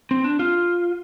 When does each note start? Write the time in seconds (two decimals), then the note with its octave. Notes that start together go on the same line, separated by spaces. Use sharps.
0.11 C4
0.24 D4
0.39 F4